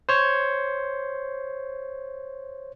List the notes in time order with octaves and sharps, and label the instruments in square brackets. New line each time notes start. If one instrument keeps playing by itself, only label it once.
[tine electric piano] C5 C#5